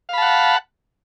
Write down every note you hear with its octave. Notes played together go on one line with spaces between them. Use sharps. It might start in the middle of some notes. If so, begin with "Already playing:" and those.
F5 F#5 A5 B5